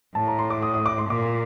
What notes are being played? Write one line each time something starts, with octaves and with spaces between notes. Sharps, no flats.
A2 A5
A#5
C6
D6
D#6
D#6
D6
C6
A#2 D6